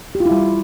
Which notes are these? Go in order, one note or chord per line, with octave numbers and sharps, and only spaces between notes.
G4
F4
E4
G3